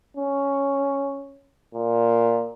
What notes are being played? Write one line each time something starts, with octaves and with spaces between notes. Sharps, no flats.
C#4
A#2